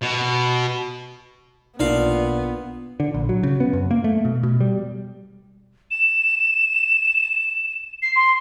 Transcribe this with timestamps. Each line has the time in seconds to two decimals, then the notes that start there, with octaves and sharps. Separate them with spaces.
0.02 B2
1.80 B1 A#2 B3 D4 F5
3.00 D3
3.14 A#1
3.29 F#3
3.43 C#3
3.60 B3
3.73 F#2
3.91 A#3
4.04 A3
4.25 B2
4.43 B2
4.61 G3
5.91 E7
8.02 C7
8.16 C6